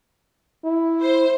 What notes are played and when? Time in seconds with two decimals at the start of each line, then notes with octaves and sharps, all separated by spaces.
0.64 E4
1.03 C5